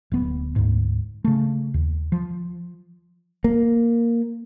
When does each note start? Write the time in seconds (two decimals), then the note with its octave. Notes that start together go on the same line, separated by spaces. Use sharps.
0.12 D1 B3
0.56 D2 G#2
1.24 C#3 A3
1.74 D#2
2.12 F3
3.44 A#3